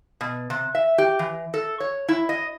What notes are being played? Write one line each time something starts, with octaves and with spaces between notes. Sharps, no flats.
B2
C3
E5
G4
E3
A4
C#5
E4
D#5